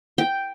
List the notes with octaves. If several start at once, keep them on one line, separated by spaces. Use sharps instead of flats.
G5